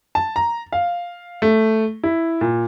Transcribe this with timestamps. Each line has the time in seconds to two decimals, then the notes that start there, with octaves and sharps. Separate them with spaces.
0.15 A5
0.36 A#5
0.72 F5
1.42 A3
2.03 E4
2.41 A#2